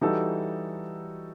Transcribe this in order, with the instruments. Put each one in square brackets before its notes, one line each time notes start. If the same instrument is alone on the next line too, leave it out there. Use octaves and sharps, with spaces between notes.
[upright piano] E3 G3 D#4 F#4 A4